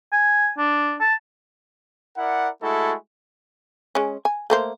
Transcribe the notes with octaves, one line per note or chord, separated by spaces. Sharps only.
G#5
D4
A5
E4 A#4 D5 F#5
G#3 A3 E4 F#4 A4
G#3 C#4
G#5
A3 A#3 C5